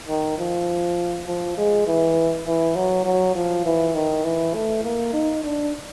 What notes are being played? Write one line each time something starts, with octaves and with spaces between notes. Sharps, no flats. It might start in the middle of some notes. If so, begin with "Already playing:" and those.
D#3
F3
F3
G#3
E3
E3
F#3
F#3
F3
E3
D#3
E3
A3
A#3
D#4
D4